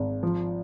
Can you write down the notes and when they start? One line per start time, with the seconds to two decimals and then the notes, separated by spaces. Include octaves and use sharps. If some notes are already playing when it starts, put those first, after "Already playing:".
Already playing: G#1
0.23 F3